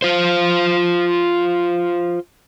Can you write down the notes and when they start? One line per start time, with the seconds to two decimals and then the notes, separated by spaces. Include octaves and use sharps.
0.02 F4 C5